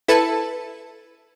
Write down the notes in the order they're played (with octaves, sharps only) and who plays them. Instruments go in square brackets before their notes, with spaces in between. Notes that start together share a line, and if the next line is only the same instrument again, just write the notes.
[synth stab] E4 A4 B4 A5